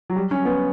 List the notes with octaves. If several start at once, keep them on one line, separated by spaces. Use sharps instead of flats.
F#3
G3
C#4
B3